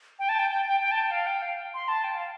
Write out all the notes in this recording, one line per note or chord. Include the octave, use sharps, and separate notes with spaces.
G5
A5
G5
G5
G5
G5
A5
G5
F5
G5
F5
C6
A5
G5
F5